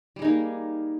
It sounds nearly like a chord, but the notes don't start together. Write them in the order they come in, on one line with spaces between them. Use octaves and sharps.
G3 G#4 D#4 A#3